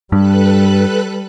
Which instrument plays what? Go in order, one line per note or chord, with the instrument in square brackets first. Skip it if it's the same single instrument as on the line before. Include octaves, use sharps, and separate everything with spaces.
[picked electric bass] G2 [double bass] G3 [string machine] A4 B4 F#6